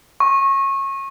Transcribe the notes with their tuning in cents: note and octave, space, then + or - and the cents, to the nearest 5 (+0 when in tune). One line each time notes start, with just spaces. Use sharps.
C#6 -25